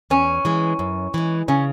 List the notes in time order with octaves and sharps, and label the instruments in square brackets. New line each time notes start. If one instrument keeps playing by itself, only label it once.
[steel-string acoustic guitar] E2 [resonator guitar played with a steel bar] C#4
[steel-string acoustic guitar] E3 G#3
F#2
E3 G#3
[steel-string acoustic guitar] C#3 [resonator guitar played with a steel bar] C#4